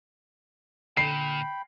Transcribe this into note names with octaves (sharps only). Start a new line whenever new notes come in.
A#2 D3 G5 B5 C7